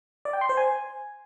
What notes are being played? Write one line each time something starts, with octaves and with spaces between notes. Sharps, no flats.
D5
G5
C6
C5
G#5